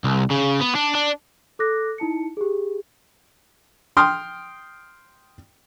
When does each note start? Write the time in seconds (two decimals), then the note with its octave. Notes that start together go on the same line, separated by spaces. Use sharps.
0.04 C2
0.31 C#3
0.61 B3
0.76 D4
0.95 D4
1.59 A4 D6 F#6 A#6
1.98 D#4 E4 A5 C#7
2.37 G4 G#4
3.97 G5 C6 D#6 F6